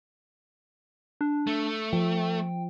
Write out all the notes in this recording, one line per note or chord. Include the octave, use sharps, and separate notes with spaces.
D4
A3
F3 G5